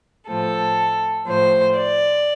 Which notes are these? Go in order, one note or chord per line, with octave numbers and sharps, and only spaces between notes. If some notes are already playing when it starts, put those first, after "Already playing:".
A2 F3 A4
A2 F3 C5
D5